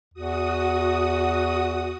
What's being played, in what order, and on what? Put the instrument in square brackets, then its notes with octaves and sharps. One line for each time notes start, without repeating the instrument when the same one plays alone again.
[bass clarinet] E2 [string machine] F#4 D#6